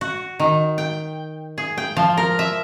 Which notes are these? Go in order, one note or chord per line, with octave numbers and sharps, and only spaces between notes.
F#4
D#3
G5
G#4
G5
F3
A#4
E5